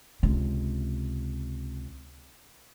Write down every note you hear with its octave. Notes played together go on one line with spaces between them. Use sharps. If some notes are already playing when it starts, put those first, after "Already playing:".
C#2 C3